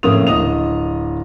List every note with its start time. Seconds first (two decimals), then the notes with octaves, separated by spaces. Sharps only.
0.03 F2 A2 C#3 A#3 D#6 F7
0.27 D1 D#5 D#6 F7